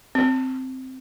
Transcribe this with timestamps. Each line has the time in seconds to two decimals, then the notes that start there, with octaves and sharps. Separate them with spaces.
0.15 C4